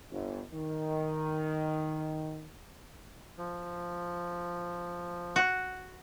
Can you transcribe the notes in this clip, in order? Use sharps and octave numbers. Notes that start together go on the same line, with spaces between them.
G1
D#3
F3
F#4